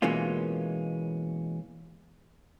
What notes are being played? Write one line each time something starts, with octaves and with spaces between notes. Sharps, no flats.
B2 E3 G#3 A#3 C#4 F4